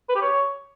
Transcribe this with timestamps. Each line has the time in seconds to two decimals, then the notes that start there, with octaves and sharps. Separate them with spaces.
0.09 B4
0.15 G4
0.22 C#5